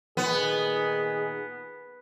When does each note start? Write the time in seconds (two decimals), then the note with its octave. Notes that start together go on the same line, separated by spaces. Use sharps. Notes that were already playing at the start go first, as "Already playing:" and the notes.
0.17 A#2 D#3 B3 G#4